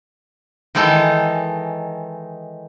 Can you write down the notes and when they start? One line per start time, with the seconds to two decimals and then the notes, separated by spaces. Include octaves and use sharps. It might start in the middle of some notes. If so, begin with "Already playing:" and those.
0.75 D#3 E3 G#3 D#4 A4